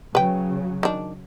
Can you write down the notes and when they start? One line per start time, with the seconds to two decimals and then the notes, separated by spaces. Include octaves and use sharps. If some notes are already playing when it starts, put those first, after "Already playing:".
0.15 C#3 F#3 B4 G5
0.83 D#3 D4